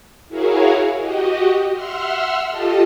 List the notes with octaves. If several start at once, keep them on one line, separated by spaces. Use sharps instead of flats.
E4 F#4 G#4 A#4 C#5 F5
F#4 G4 D#5
E5 F#5 C6 E6 F6
F4 G4 A4 D#5 A5